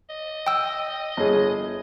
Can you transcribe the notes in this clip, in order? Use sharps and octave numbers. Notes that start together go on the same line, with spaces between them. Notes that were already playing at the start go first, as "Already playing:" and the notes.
D#5
G5 E6
G1 G#4